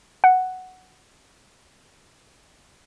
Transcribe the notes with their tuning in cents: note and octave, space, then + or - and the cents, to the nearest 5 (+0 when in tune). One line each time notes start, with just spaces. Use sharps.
F#5 +5